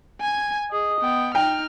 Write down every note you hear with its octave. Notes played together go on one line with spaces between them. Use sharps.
G#5 G#6
G#4 D#5
B3 G5
D#4 G5 F6